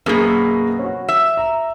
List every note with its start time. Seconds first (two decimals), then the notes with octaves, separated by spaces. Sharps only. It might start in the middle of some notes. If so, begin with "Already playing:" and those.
0.06 F#2 B2 A#3 G#4 A#4
0.79 C#4 F#4
1.08 E5
1.37 A#5